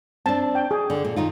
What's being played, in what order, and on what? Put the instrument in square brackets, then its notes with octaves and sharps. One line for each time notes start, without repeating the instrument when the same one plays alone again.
[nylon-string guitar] C4 D4 [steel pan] A5
[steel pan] G5
G#4
[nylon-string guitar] D3
A#2
D#3 D#4 F4